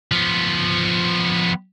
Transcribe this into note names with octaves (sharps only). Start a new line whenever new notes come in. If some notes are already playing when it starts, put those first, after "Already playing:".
F3 B3